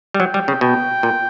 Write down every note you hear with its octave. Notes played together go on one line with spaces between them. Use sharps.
G3
F#3 G5
G3
C#3
B2 G5
A#2